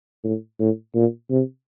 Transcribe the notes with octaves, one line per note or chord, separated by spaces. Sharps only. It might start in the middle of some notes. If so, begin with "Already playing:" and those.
A2
A2
A#2
C3